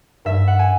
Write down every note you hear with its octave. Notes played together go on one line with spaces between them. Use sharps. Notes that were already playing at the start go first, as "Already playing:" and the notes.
G2 E5
F#5
G#5